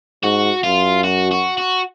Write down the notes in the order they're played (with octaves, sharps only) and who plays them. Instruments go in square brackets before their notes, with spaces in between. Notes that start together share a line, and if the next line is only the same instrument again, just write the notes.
[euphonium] G#2 [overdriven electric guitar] F#4
[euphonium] F#2 [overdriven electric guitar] F4
[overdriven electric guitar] F#4
F#4
F#4